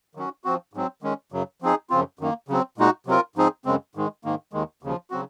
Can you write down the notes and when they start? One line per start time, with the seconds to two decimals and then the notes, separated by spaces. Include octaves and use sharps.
0.15 D#3 F#3 C#4 F#4
0.44 F3 C4 F#4
0.73 G#2 F#3 C4
1.02 D#3 G#3 C#4
1.32 F#2 C#3 F#3
1.62 F3 C4 D#4 G#4
1.90 F#2 C#3 F3 C4 F4
2.19 F#2 D#3 A#3
2.48 C#3 F#3 C4
2.78 A#2 G#3 D#4 F#4
3.07 C3 F#3 C4 F4 A#4
3.36 G#2 F3 C4 D#4 G#4
3.65 F#2 C#3 G#3 C4
3.95 G#2 D#3 G#3
4.24 G#2 D#3 A#3
4.53 D#2 D#3 G#3
4.83 D#2 C#3 F3
5.11 C#3 F#3 C4 F#4